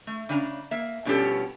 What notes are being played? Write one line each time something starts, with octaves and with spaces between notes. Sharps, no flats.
A3
C#3 D4 G#5 A#5
A#3 E5
G2 B2 F3 C#4 G4 A4